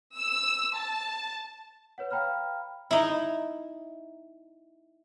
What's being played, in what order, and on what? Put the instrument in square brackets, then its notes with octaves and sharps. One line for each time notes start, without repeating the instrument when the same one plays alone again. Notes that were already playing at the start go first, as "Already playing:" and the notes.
[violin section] E6
A5
[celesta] B4 C#5 F#5
F5 G5 A#5 B5 F6
[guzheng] D#4 E4